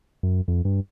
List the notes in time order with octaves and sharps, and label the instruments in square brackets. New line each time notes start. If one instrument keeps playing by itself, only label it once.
[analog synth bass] F#2
F2
G2